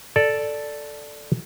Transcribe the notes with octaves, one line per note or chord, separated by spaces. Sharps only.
A4 D5